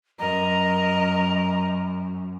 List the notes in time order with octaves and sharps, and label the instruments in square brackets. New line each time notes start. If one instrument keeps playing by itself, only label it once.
[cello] F#2 [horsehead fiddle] A#4 D#5 [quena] A#5